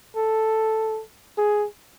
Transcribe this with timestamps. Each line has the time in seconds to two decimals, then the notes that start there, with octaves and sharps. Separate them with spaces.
0.16 A4
1.38 G#4